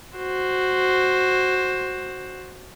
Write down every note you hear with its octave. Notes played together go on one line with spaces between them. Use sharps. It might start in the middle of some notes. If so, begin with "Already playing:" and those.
F#4 C5